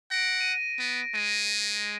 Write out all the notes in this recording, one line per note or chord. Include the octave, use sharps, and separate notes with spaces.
F#5 A#6 D7
D#7
B3
G#3 D#7